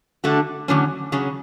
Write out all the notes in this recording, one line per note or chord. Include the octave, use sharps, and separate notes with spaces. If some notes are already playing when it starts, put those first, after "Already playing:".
D3 A3 D4 F#4
E2 D3 F#3 A3 C#4
C#3 F#3 C#4